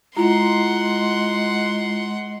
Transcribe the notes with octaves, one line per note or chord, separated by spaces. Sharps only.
G#3 E4 F4 F#5 A#5 C6